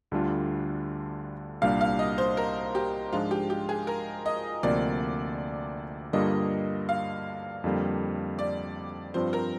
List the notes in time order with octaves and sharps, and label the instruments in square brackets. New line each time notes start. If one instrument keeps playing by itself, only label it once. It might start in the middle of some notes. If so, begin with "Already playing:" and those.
[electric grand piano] D2 D3 G3 D4 F4
[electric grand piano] C2 A#2 G3 A#3 D4 [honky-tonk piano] F5
[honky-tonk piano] F5
D#5
C5
A#4
G4
[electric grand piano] G#2 F3 G#3 D4 [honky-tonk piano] F4
[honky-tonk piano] G4
G4
G#4
A#4
D#5
[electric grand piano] D2 C3 F3 A#3 [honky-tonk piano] D5
[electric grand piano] G2 D3 G3 A#3 F4 [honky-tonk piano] D#5
[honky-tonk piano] F5
[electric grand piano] F2 D3 G3 A#3
[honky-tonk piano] D5
[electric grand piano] G2 F3 C4 F4 [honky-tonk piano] C5
[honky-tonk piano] A#4